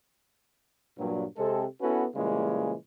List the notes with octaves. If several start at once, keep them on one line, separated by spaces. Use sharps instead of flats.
G2 A#2 F#3
C3 G#3 C4 A4
B3 C#4 E4 F#4 A4 B4
A#2 C#3 E3 G3 G#3 A#3